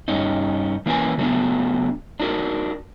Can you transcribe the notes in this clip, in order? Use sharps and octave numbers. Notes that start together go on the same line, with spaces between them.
G2 C#4 D#4
E3 A#3 C#4 B4 G#5
C#3 F#3 A3 B3 D4
D4 D#4 F#4 A#4